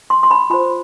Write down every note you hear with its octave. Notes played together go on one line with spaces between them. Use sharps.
C6
C6
B5
F4 C5 B5